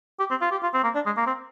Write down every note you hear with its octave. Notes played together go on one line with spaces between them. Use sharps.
G4
C4
F4
G4
F4
C4
A#3
D4
G#3
A#3
C4